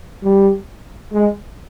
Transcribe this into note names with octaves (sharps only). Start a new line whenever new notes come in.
G3
G#3